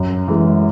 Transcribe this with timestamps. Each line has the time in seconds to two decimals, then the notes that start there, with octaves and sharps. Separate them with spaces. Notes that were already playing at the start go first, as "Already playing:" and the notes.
Already playing: F#2
0.28 E3 G#3